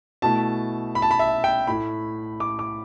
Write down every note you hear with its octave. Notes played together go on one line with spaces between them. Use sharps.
B2 A3 E4 A5
B5
A5
B5
E5
G5
A2 A3 E4 B5
D6
D6